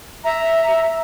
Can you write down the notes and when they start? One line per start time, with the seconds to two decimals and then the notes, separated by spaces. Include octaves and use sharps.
0.25 E5 A#5